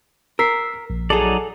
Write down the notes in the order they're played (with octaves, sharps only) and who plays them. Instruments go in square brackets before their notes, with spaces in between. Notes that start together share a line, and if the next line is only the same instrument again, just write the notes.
[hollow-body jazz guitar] A#4 [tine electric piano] E6 B6 C7
[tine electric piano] A#1
[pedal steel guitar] F#3 D#4 D5 [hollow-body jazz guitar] G#4 A4